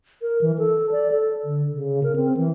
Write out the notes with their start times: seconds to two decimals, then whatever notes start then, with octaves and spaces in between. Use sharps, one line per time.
0.22 A#4
0.41 E3
0.59 A4
0.92 D5
1.12 A4
1.44 D3
1.73 C#3
2.03 A#4
2.16 C4
2.37 E3